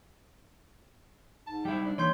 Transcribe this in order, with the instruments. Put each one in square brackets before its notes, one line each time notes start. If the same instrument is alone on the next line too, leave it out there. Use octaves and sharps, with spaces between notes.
[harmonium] G#2 [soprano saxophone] A5
[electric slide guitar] G3 E4 [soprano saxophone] G5
[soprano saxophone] D4
[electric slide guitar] E3 [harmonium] G3 A#3 D#4 [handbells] C#5 C6 G6